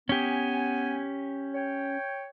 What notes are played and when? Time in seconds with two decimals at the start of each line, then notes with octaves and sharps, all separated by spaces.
0.09 B3 C#4 G4 G#5
1.54 C#5 G5